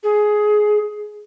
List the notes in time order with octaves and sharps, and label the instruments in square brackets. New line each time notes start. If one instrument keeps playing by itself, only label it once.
[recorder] G#4